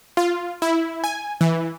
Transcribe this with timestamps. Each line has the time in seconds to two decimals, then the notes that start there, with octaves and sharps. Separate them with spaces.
0.17 F4
0.62 E4
1.04 G#5
1.41 E3